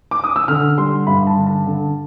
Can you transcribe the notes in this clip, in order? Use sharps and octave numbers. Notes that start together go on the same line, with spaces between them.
D6
D#6
E6
D3 F6
G3 C6
G2 B5
A5
D3
A5
D3